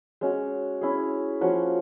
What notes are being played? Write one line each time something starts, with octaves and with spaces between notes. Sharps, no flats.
G#3 C#4 F#4
C#4 E4 G#4
F3 A#3 C#4 F#4